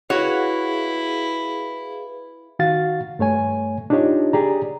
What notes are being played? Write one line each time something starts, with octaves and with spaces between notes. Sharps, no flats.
E4 F#4 G#4 B4 C#5 F5
D#3 F#4 F5 A6
G2 A3 C#5 G#5
D4 D#4 F4 G4 C#5 D#5
G4 G#4 D5 A#5